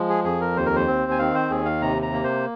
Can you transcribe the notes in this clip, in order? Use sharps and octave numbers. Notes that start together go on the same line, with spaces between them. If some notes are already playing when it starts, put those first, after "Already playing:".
Already playing: F3 G#3
G#4
F2 G#4
A#4
D#2 C5
A#4
C5
C4
G#5
D#3 F5
C5
D#2 G#4
F5
C3 A#5
A#5
A#3
C5